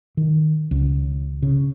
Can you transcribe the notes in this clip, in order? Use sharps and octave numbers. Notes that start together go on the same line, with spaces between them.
D#3
C#2
C#3